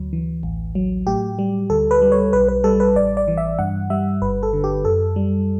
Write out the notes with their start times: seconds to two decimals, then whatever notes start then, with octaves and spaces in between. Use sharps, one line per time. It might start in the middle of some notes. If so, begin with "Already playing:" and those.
Already playing: D2 F#3
0.13 E3
0.43 A1
0.75 F#3
1.07 A2 G4
1.39 G3
1.70 D2 A4
1.91 B4
2.02 G3
2.12 C#5
2.33 B1 B4
2.48 B4
2.64 G3 A4
2.80 B4
2.96 A1 D5
3.17 D5
3.28 E3
3.38 E5
3.59 G2 F#5
3.90 G3 E5
4.22 G1 B4
4.43 A4
4.53 D3
4.64 G4
4.85 F#2 A4
5.16 G3